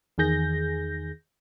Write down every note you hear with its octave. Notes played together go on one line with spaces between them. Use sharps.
E2 D#3 G#4 G6 A#6